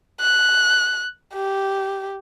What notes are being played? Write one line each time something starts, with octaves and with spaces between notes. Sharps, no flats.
F#6
G4